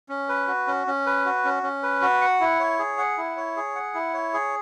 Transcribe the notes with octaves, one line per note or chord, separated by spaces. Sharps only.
C#4
B4
F#4
C#4
C#4
B4
F#4
C#4
C#4
B4
F#4
F#5
E4
C#5
G#4
F#5
E4
C#5
G#4
F#5
E4
C#5
G#4